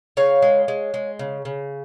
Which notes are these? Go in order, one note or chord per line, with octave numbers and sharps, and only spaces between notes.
C#3 C#5 F5
G#3
G#3
G#3
C#3
C#3